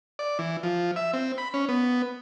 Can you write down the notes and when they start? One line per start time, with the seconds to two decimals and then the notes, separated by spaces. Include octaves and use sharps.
0.19 D5
0.39 E3
0.63 F3
0.96 E5
1.13 C4
1.38 B5
1.54 C#4
1.69 B3